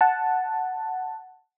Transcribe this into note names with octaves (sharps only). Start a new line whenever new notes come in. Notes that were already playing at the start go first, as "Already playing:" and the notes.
F#5 A5